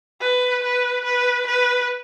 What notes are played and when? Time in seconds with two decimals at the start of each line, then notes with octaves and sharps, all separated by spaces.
0.21 B4
0.63 B4
1.04 B4
1.46 B4